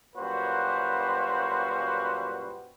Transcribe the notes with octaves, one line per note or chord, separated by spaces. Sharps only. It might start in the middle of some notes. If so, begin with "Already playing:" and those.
F#2 A#2 G3 F#4 B4 C5